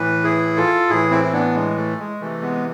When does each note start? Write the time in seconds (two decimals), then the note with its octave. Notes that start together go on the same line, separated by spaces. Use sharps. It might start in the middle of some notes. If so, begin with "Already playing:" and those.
Already playing: A2 E3 B4
0.24 E4 G#4
0.56 F4 A4
0.89 A2 E3 E4 G#4
1.11 C4 E4
1.24 E4
1.33 B3 D4
1.54 G#3
1.76 A3
1.99 G#3
2.20 C3 E3 A3
2.41 G#3 B3